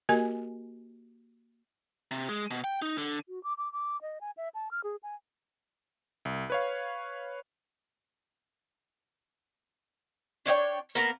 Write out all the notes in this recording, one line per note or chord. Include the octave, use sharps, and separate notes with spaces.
A#3 F#4 G4 A#4 D#5 G#5
C3
G#3
B2
G5
D#4
D3
F#4
D6
D6
D6
D#5
G#5
E5
A5
F6
G#4
G#5
C2
B4 C#5 F5
D4 C#5 D5 G5
A#3 B3 A#4